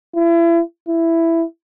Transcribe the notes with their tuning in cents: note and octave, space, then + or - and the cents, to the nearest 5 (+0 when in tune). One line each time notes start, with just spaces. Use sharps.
E4 +35
E4 +10